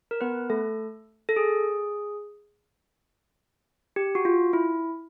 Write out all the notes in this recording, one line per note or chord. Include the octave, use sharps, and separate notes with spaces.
A#4
B3 B4
A3 A4
A4
G#4
G4
F#4
F4
E4